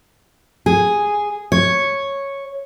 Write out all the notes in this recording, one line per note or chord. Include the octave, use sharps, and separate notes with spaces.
G#4
C#5